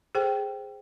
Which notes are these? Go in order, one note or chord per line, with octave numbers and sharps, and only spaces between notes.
G#4 A4 C5 G5